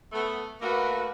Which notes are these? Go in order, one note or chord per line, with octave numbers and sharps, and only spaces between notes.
A3 B3
A3 A#3 F#4 B4